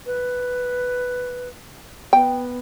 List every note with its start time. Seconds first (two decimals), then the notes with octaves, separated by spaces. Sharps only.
0.06 B4
2.13 B3 G5